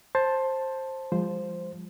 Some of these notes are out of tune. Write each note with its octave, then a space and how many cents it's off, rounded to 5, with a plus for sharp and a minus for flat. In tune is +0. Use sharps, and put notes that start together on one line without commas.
C5 +15 A5 +0
F3 +0 G#3 -40 C5 +0